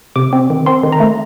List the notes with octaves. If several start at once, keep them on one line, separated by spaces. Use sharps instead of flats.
C3 D6
C4
D#3
C4 C6
D#3
A#5
A3